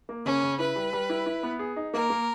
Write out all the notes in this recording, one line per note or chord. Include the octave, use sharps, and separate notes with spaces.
A#3
C#3 C#4
C#3
E4 B4
G3
G3
E4
E4
B3
G#4
D#4
A#3 A#4
A#3